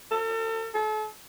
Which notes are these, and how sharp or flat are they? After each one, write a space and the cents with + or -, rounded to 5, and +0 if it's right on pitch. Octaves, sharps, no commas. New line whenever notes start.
A4 +40
A4 -40